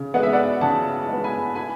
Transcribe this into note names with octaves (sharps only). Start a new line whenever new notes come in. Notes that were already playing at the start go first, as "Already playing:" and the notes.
Already playing: C#3
G#3 B3 F#5
E5
D5 F#5
C#3 F#5 A5
G#3 B3
G#5 B5
G#5 B5